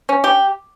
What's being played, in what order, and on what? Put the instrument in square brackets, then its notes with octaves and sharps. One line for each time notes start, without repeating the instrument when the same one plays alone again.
[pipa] C#4
G4